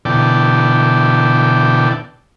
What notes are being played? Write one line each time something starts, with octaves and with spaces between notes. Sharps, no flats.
B2 D3 E3 D5 G5 A5